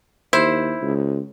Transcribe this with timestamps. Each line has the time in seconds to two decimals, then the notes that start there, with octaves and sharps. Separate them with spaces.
0.33 D#2 E4 C5
0.82 C#2